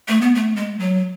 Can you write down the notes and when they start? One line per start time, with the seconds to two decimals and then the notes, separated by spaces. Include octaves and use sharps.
0.08 A3
0.21 B3
0.35 A3
0.56 G#3
0.79 F#3